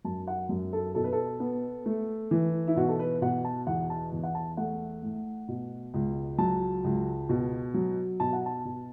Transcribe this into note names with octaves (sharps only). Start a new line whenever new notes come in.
F#2 A5
F#5
F#2
A4
B2 A4
B4
A4
B3
A3
E3
E4
B2 F#4
A4
B4
B2 F#5
A5
E2 F#5
A5
E2
F#5
A5
A3 F#5
A2
B2
C#2
F#3 A5
C#2
B2
F#3
B2 A5
F#5
A5
B2